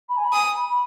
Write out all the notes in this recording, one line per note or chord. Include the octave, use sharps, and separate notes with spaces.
B5
G#5
B5
G#5 D#6
G#5
B5
B5